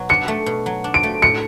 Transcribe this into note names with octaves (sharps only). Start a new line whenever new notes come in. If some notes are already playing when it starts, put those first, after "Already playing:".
Already playing: B2 F#3
D4 C#7
A3
B2
F#3
D4
D7
A3
A2 C#7